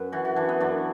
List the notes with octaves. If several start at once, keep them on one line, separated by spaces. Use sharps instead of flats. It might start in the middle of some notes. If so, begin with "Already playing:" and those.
Already playing: F#2 B4
E3 F#4
F#4
E3 D4
B3
F#2 D4